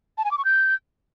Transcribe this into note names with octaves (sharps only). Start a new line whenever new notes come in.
A5
G#5
D6
C#6
G6